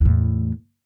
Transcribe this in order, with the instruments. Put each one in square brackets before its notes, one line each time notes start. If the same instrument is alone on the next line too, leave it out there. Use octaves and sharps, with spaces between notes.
[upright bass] E2 A2